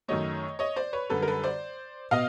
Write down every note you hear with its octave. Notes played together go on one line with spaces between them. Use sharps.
F#2 D#3 F#3 A3 C#5 D#5
C#5 D#5
C5 D5
B4 C#5
F#2 D3 G3 A4 B4
A#4
A4 B4
C5 D5
B2 D#5 F5